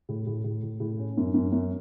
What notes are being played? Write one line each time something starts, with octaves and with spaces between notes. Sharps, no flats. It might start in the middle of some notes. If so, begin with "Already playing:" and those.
A2
A2
A2
A2
A2
C#4
F#2
F#2
F#2